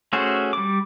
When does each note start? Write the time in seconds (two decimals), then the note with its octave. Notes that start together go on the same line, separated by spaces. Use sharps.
0.13 A3 C#4 F#4 G#4 C5
0.53 G3 D6